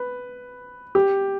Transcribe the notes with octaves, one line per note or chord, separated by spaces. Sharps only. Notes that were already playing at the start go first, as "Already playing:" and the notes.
Already playing: B4
G4